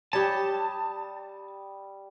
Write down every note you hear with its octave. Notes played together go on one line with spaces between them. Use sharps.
G3 G4 C#5 A5 D#6